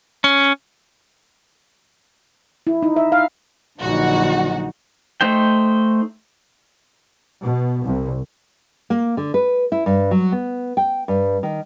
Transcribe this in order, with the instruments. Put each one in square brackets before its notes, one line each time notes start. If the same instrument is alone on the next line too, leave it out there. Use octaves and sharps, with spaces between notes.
[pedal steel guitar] C#4
[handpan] E4
D#4
E5
F5
[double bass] A#1 [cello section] D3 F#3 D#4 [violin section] F#4
[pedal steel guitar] A3 D#4 C5 G5
[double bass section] B2
C2
[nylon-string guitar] A#3
D3
B4
E4
G2
F#3
B3
G5
G2
D#3